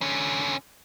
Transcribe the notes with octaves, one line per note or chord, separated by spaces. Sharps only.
D3 C#4